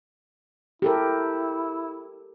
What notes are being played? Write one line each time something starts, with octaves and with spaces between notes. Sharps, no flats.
E4 G4 A4 A#4